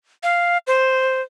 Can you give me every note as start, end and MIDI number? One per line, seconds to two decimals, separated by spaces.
0.23 0.58 77
0.67 1.22 72